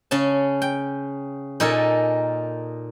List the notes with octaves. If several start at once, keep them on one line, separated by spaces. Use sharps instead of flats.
C#3 C#4 A5
G5
A#2 D#4 A4 A#4 G#5